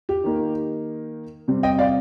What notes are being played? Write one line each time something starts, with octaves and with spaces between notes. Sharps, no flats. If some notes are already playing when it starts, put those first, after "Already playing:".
G4
D#3 A#3 D#4
C3 G3 C4
D#5 G5
D5 F5